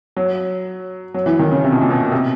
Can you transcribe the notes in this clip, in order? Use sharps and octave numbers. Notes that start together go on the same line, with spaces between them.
F#3
F#3
E3
D#3
C#3
C3
B2
A#2
B2
C3